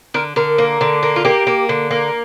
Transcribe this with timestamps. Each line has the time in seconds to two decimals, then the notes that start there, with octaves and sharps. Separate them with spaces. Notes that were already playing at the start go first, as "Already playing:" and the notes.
0.14 D3 A#4
0.36 D3 A#4
0.58 A#3
0.81 D3
1.03 A#3
1.16 F4
1.25 A#3 G4
1.47 A#3
1.69 D3
1.91 A#3